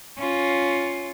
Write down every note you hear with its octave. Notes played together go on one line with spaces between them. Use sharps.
C#4 F4